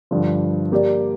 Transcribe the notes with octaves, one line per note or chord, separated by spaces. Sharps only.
G2 D3 F3
A#3 G4 D5